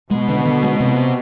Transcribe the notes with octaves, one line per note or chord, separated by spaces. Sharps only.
B2 G#3
D3
D3
G#3
C3